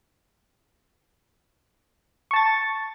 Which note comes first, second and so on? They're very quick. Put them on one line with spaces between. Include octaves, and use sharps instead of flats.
C#6 A5 A6